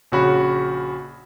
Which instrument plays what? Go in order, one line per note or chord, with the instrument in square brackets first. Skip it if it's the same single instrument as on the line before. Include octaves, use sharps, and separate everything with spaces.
[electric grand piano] A#1 C#3 F#4 C#5 B5